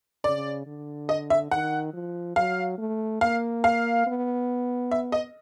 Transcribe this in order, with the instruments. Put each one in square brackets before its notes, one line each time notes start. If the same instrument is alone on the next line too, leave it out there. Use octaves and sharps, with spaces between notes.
[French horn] C#3 [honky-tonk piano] D5
[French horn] D3
[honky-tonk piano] D#5
E5
[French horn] D#3 [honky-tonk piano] F#5
[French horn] F3
[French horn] F#3 [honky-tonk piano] F5
[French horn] A3
[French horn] A#3 [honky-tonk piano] F5
[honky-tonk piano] F5
[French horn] B3
[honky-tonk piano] E5
D#5